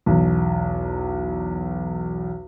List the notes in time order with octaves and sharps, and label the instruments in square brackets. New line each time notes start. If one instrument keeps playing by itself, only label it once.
[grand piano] B1 E2